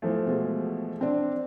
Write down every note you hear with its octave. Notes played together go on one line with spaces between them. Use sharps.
E3 F3 A3
B2 G#3
C4 D4